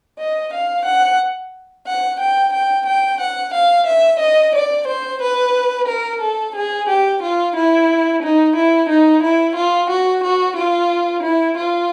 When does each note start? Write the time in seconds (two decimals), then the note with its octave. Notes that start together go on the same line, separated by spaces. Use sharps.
0.20 D#5
0.53 F5
0.86 F#5
1.87 F#5
2.20 G5
2.54 G5
2.87 G5
3.21 F#5
3.55 F5
3.88 E5
4.21 D#5
4.55 D5
4.88 C5
5.22 B4
5.89 A#4
6.22 A4
6.56 G#4
6.89 G4
7.23 F4
7.56 E4
8.23 D#4
8.56 E4
8.90 D#4
9.23 E4
9.57 F4
9.91 F#4
10.24 F#4
10.57 F4
11.24 E4
11.58 F4